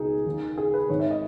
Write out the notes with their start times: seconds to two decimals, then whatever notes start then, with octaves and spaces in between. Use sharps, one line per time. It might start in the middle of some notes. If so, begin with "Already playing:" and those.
Already playing: C#2 B2 D#4 G#4
0.26 D#2 D#3
0.58 G#4
0.74 B4
0.89 G#1 G#2 D#3 C#5
1.00 E5
1.11 D#5